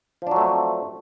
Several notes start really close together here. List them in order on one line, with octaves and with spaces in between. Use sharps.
F3 D4 F#3 A3 C4